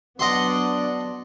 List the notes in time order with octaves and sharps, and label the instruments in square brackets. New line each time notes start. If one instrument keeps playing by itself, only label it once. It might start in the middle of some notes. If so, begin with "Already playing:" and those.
[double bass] F#3 B3 [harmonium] D4 D5 [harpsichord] D#5 F#5 C6